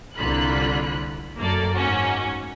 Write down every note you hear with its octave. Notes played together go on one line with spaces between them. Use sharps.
C2 D3 A#3 F4 B5 F#6
F#2 A#3 A4 D5
G#2 A#3 C#4 F#4